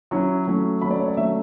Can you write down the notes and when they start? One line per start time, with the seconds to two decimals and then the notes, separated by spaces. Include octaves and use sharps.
0.11 F#3 C#4 E4 C#6
0.47 F#3 A3 C#4
0.82 F#3 A3 C#4 B5
0.91 D5
1.00 C#5
1.08 D5
1.17 F#3 A3 C#4 E5